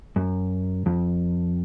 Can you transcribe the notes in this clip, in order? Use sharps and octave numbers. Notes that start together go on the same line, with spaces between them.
F#2
F2